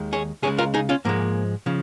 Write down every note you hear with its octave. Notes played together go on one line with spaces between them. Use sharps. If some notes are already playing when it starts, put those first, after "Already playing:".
Already playing: D#2 D#3 G#3
G#4 C#5
C#2 C#3 G#3 G#4 C#5
F4 A#4
D#4 G#4
C#4 F4
G#2 F3 G#3 A#3
C#3 F3